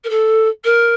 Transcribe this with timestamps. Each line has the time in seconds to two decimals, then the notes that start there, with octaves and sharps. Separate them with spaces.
0.04 A#4
0.09 A4
0.64 A#4